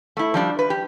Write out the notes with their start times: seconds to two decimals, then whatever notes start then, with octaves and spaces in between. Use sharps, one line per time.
0.17 A3 E4
0.34 F3 G3 D4
0.59 B4
0.70 G4